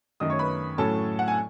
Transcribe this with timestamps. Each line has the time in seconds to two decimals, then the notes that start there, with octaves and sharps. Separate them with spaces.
0.20 F#2 D#3 A3 D#5 D#6
0.30 C#5 C#6
0.39 B4 B5
0.78 A2 F#3 C#4 A4 A5
1.19 F#5
1.28 G#5